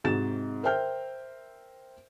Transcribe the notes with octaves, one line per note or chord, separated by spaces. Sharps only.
G#2 C3 D#4 F#4 A6 E7
A#4 C5 E5 G5 F6 G6